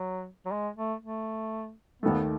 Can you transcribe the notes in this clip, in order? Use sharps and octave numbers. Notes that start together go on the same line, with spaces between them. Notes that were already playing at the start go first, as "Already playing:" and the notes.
Already playing: F#3
F#3
G#3
A3
A3
D#2 D#3 A3 B3